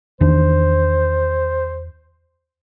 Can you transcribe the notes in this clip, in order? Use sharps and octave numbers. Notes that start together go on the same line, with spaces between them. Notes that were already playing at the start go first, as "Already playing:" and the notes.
E2 D#3 D4 C5